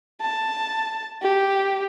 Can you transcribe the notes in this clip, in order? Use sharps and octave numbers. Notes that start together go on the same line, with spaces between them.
A5
G4